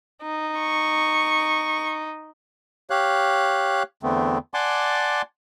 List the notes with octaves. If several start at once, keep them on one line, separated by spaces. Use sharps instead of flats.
D#4
C#6
G4 C#5 F5 F#6
E2 D3 A3 B3 C4
D5 F#5 G#5 A5 C6 D6